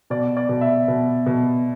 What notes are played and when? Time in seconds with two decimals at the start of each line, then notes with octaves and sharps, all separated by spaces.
0.10 B2 D5
0.37 D5
0.49 B2
0.61 E5
0.88 B2
1.26 B2